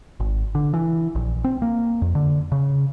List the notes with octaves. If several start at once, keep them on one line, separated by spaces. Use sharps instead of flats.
G#1
D3
E3
A#1
C4
A#3
F2
D3
C#3